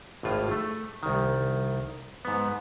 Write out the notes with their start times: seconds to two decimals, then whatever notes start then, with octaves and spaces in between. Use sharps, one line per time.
0.23 G#1 A2 F4
0.51 A3
1.03 C2 D#3
2.25 G#2 B3